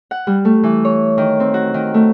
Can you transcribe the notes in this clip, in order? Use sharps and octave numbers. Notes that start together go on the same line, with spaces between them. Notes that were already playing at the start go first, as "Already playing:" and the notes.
F#5
G3
A3
E3
C#5
D#3
C4
F#4
D#3
A3